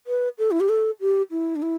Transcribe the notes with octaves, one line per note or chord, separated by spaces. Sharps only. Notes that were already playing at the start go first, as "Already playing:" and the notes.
B4
A4
E4
G4
A4
G4
E4
D4
E4